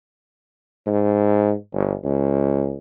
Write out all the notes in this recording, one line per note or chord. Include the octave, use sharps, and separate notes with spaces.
G#2
G1
C#2